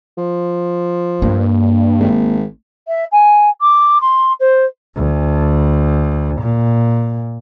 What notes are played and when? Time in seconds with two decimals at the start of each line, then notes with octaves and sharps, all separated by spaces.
0.17 F3
1.22 G2 A#3
2.00 G#1
2.88 E5
3.12 G#5
3.61 D6
4.01 C6
4.40 C5
4.96 D2
6.41 A#2